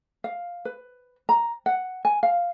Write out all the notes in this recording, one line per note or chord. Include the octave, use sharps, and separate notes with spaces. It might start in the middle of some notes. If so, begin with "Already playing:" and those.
F5
B4
A#5
F#5
G#5
F5